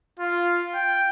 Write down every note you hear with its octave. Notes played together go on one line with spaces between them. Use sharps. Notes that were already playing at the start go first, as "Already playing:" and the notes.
F4
G5